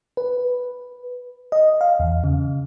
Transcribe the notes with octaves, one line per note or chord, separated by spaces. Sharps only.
B4
D#5
F5
E2
C#3